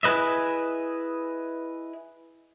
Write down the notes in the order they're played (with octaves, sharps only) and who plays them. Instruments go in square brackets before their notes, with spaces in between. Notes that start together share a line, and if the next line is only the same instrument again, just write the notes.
[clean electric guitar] E4 G#4 B4 D#5 E5